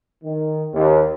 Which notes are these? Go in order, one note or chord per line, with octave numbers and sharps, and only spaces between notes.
D#3
D#2